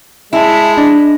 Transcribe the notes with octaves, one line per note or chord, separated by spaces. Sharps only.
G#3 E4 E5 A5
D4 D#5